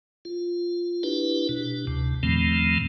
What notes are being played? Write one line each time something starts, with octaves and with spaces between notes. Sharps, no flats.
F4
D4 E4 G4 B4
B2 D4
D2 C3
E2 A#2 D#3 F3 A3 C4